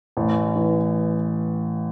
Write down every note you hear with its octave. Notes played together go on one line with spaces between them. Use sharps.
A1
E3